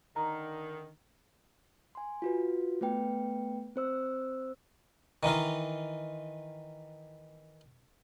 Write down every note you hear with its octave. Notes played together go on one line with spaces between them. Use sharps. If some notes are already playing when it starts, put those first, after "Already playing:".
D3 D#3 A#5
G#5 C6
F4 F#4 B4
A3 B3 B4 G5
C4 C5 E6
D#3 E3 D#4 F4